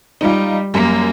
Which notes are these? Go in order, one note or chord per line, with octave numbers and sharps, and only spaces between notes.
G3 D#4 F4
F#2 G3 A#3